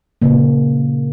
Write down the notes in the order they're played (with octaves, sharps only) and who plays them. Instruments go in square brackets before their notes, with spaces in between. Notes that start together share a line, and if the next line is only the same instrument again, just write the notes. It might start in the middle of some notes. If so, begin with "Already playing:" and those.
[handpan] A#2 C#3 A#3